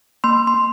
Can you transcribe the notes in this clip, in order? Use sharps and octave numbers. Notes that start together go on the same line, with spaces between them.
A#3 C6
C6
A#3